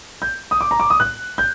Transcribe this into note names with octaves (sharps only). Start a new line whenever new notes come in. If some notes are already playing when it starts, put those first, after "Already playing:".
G6
D#6
D6
A#5
D6
D#6
F#6
G6